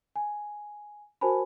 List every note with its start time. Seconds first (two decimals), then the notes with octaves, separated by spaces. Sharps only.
0.16 G#5
1.21 F#4 A#4 C5 G#5 A5 B5